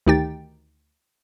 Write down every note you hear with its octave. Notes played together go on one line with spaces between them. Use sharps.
D2 D#3 D#4 G4 G5 A6